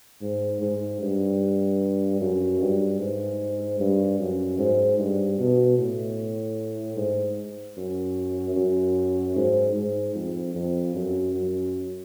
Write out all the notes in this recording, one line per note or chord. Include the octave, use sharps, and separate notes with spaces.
G#2
G#2
G2
F#2
G2
G#2
G2
F#2
G#2
G2
B2
A2
G#2
F#2
F#2
G#2
G#2
F2
F2
F#2
F#2